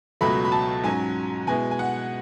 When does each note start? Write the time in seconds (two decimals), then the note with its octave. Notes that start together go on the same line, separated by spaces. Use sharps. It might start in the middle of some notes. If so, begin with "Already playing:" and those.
0.21 C#2 B2 F#3 A3 B5
0.45 B5
0.52 A5
0.84 G#2 F#3 C#4 G#5
1.47 B2 G#3 B3 E4 G#5
1.71 G#5
1.79 F#5